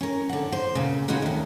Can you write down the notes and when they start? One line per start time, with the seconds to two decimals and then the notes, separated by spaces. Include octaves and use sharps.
0.01 C#4 A#4
0.29 D3 F#5
0.52 C5
0.75 A#2 C#3
1.08 B3 C#4 D#4 F4 F#4 G#4
1.22 D2 D#3